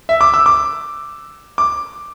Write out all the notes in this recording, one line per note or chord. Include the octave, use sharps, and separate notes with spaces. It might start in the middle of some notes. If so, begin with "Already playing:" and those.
E5
D6
E6
D6
D6